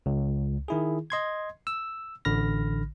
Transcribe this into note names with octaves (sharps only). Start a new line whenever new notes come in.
C#2
D#3 E4 G#4
D#5 C6 G#6
E6
A1 D3 B5 F6 A#6